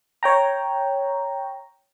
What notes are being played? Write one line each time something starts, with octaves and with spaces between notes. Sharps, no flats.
C#5 G5 A#5